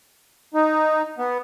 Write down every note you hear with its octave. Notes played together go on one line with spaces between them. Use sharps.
D#4
B3